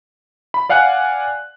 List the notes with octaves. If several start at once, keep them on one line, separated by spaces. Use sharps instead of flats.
B5
D5 F5 F#5 G#5 F#6